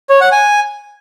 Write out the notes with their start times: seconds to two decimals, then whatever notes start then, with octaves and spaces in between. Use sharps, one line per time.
0.10 C#5
0.21 F#5
0.32 G#5